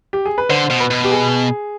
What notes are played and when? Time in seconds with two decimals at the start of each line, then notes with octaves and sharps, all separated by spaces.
0.13 G4
0.26 G#4
0.38 B4
0.50 D3 C5
0.70 B2
0.80 B4
0.91 B2
1.04 G4
1.11 G#4